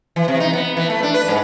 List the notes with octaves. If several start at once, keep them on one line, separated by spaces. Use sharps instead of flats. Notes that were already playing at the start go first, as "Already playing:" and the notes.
E3
C3
D#4
B3
E3
A3
D4
B4
G#2